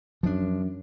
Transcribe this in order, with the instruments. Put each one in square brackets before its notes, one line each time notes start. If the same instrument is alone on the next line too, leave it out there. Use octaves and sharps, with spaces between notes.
[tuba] F#2 [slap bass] F3 D4